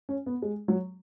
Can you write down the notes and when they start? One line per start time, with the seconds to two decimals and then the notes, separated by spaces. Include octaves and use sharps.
0.09 C#4
0.26 B3
0.42 G#3
0.68 F#3